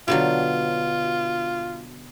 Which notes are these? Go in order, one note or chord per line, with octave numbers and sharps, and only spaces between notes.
B2 D3 F#3 F4